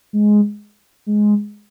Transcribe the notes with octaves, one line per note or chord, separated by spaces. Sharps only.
G#3
G#3